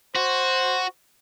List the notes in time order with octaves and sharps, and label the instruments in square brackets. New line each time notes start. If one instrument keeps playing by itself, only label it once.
[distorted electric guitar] F#4 [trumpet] C5